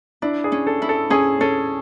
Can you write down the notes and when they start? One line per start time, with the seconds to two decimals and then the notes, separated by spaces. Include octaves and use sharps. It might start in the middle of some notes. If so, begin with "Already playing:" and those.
0.22 D4 E4
0.44 G#4
0.52 C#4
0.67 A4
0.82 E4
0.89 A4
1.10 C#4 G#4
1.41 C#4 A4